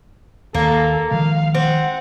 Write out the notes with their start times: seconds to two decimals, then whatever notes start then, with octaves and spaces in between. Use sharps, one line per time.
0.55 D#2 A#3 A4
1.11 D#3 F3 G#3 F5
1.55 C4 F#5